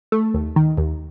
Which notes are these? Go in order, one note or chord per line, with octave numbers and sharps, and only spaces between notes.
A3
D#2
D#3
D#2